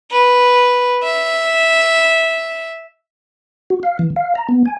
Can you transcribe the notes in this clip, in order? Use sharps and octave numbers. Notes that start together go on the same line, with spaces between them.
B4
E5
F#4
F5
E3
F5
A#5
B3
G#5